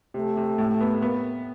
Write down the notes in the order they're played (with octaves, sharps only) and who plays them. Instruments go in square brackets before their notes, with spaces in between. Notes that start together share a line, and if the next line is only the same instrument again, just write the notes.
[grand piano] C3 [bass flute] A3
[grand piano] C3
A2
B3
[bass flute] A#3 [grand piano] B3